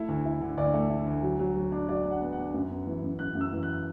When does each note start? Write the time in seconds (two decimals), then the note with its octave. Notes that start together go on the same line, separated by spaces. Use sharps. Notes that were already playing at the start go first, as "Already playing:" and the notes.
Already playing: A3 E4
0.08 D2
0.25 E4
0.41 D3
0.58 D2 D5
0.73 A3
0.90 E4
1.07 D2
1.23 F#3
1.39 F#3
1.56 F#3
1.72 D4
1.88 F#3 D5
2.05 D4
2.11 F#5
2.21 B3
2.32 F#5
2.38 D4
2.54 F#2
2.71 B3
2.86 E3
3.02 F#2
3.19 F#2 F#6
3.35 F#2
3.41 E6
3.52 E3
3.63 F#6